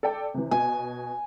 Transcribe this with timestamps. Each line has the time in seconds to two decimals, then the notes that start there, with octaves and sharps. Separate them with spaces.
0.03 A4 D5 G5
0.34 C3 E3
0.51 B2 G#5